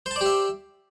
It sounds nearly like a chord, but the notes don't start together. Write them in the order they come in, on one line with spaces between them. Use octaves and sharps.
C5 A5 D5 G4 E5